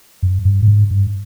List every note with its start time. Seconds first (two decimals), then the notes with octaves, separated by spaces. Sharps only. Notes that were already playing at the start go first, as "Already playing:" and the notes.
0.23 F#2
0.45 G2
0.62 A2
0.68 G#2
0.91 G2